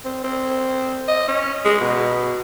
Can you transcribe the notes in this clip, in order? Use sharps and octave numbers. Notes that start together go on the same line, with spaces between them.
C4
C4
D#5
C#4
G#3
B2